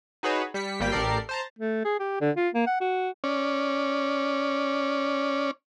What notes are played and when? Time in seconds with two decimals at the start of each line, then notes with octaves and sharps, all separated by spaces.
0.23 D#4 F#4 G#4 B4 C#5
0.54 G3 B6 C#7
0.80 G#1 G3 A#3 G5 B6
0.92 A1 G4 A4 A#4 D5 C7
1.29 C5 A5 A#5
1.59 A3
1.85 G#4
1.99 G4
2.21 D3
2.37 F4
2.54 A#3
2.67 F#5
2.81 F#4
3.24 C#4 D5